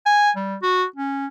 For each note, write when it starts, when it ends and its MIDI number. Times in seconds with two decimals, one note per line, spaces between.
0.06 0.31 80
0.36 0.56 55
0.62 0.84 66
0.96 1.27 61